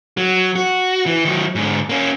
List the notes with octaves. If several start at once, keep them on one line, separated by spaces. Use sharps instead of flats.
F#3
F#4
E3
D#3 F#3
G#2 D3
A#3 C#4